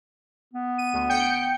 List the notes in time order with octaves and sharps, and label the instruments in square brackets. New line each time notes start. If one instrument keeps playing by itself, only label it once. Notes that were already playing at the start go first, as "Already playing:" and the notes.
[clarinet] B3
[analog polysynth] D#7
D2
G5 G6 C#7